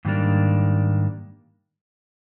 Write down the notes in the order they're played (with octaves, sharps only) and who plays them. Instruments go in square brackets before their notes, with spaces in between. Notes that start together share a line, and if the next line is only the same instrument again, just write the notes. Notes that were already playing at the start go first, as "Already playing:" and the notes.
[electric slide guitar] G#2 D#3 G3 A#3 D4